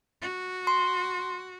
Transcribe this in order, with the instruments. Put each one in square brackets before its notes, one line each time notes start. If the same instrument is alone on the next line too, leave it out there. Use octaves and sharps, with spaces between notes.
[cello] F#4
[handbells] C6